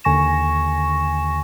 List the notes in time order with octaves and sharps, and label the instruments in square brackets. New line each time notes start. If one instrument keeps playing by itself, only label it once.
[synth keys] D#2 D3 G#5 C#6 A#6 E7